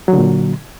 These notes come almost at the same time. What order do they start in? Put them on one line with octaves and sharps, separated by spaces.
F#3 D3 A#2